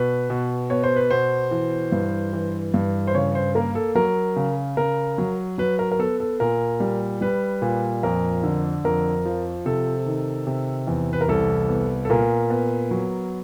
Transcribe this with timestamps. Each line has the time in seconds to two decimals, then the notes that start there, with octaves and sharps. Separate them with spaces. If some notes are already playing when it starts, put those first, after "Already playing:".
Already playing: B2 B4
0.30 B2
0.70 B3 C#5
0.84 C5
0.96 B4
1.11 B2 C5
1.51 E3
1.92 G2
2.33 E3
2.74 G2
3.07 C5
3.14 C#3 C#5
3.35 C5
3.55 A#3 A#4
3.75 A4
3.95 F#3 A#4
4.36 C#3
4.77 C#3 A#4
5.18 F#3
5.58 F#3 B4
5.79 A#4
5.92 A#4
5.99 B3 A4
6.20 A4
6.40 A#2 A#4
6.80 G3
7.21 G3 B4
7.62 A#2
8.03 F2 A#4
8.43 D3
8.85 F2 A#4
9.25 F3
9.66 C3 A4
10.06 D#3
10.47 C3
10.87 E2
11.13 B4
11.21 A#4
11.28 C2 A4
11.69 B3
12.05 A4
12.10 A#2 A#4
12.50 B3
12.91 F#3